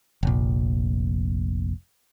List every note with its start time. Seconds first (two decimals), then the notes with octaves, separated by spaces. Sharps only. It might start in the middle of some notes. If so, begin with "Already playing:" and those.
0.23 F1 A#1